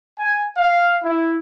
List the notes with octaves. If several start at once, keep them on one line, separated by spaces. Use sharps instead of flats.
G#5
F5
E4